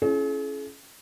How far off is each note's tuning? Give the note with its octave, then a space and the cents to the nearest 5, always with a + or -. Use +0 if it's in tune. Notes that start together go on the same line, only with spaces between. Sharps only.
C#4 +0 E4 +35 G#4 +45